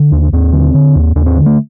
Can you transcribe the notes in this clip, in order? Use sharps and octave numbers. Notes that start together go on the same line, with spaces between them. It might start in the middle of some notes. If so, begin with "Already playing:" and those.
Already playing: D3
D#2 D4
D#2 C4
D3
D3
D#2
D#2 D4
C4
D3
A3